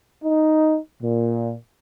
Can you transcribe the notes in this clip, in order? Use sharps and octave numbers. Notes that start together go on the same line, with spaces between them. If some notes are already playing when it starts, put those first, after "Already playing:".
D#4
A#2